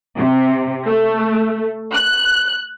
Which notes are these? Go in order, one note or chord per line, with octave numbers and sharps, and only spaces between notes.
C3
A3
F#6